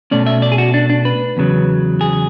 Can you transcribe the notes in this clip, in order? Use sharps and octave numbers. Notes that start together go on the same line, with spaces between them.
B2 A3 C#4 D5
E5
D5
G#4
F#4
D4
D4
B4
E2 C#3 F#3
G#4